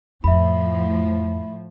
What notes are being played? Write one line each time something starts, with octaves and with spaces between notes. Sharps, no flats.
F2 A2 F3 E5 B5